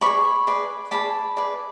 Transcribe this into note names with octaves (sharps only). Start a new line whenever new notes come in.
G#4 B4 D5 B5 C#6
G#4 B4 D5
G#4 B4 D5 A5 B5
G#4 B4 D5